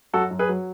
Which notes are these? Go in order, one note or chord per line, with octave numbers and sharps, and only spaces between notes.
F#2 F#4 A4
F#2
G#4 B4
F#3